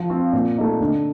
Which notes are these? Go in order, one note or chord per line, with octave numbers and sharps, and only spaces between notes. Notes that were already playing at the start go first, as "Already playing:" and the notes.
Already playing: F3
C4 F4
A#2
A3 D#4
D3